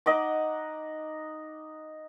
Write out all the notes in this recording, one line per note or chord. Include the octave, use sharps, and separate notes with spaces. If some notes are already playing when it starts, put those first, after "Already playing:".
D#4 D#5 F#5 D6